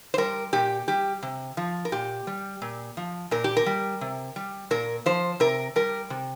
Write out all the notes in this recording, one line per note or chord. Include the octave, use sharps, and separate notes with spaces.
C5
G3 A#4
A#2 G4
G3 G4
C3
F3
A#4
A#2 G4
G3
A#2
F3
A#2 A#4
G4
A#4
G3
C3
G3
A#2 A#4
F3 C5
C3 A#4
G3 A#4
C3